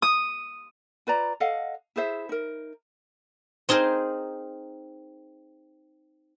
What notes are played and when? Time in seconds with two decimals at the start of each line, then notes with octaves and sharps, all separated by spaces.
0.02 D#6
1.07 F4 B4 D5 A#5
1.40 A4 D#5 F5 F#5
1.96 E4 G#4 C5 E5
2.29 D#4 A#4
3.69 C4 D#4 G#4 A#4 C5